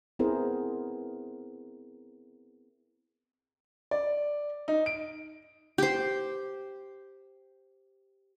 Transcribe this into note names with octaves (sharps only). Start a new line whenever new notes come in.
B3 C4 E4 G#4 A#4 C5
D5
D#4
D7
G4 C5